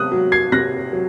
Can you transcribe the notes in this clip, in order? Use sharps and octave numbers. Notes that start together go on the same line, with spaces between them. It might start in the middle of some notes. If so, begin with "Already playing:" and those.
Already playing: C3 D#6 F#6
F#3
G#6 C7
C3 F#6 A#6
F#3